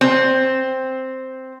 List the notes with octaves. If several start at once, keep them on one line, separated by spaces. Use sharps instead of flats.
C4